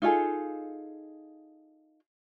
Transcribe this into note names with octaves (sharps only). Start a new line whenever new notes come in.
D#4 F4 G#4 A4